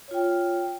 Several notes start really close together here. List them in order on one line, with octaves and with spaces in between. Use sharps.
C#5 F4 G5